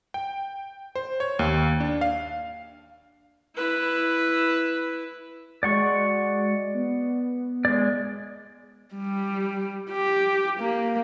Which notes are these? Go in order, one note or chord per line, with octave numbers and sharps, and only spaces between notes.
G5
C5
C#5
D#2
D4
F5
E4 B4
G#3 F#4 D5 F#5 C#6
B3
G#3 D5
G3
G4
A#3